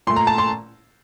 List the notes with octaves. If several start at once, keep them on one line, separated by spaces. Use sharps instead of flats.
A#2 A3 C6
A#5
A5
C6